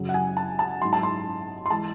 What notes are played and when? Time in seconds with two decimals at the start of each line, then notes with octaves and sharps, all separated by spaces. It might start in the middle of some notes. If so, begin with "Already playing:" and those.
Already playing: F#2 C#3 F#3
0.09 F#5
0.14 G#5
0.37 A5
0.59 A5
0.81 G#2 F#3 C6
0.93 A5
1.03 C6
1.66 C6
1.70 E3 G#3 A5